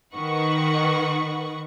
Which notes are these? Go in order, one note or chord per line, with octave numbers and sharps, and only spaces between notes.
D#3 B4 F#5 C#6